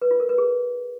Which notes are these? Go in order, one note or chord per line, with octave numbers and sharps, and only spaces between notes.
B4
F4
A#4
B4
G#4